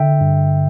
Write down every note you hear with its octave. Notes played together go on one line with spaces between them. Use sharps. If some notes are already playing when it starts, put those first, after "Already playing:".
Already playing: D3 E5 G5
G2